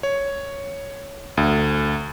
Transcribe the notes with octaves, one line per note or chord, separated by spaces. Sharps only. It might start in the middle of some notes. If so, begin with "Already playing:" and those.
C#5
D2